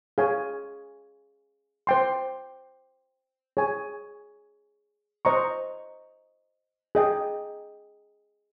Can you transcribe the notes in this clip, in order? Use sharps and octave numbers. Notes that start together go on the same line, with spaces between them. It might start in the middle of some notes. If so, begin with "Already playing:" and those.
G#4 C#5 F5 G#5
C5 G5 C6
G#4 C#5 G#5
C5 D#5 A#5 C#6
G#4 D#5 G5